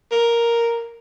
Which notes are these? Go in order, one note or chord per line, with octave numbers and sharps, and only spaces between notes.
A#4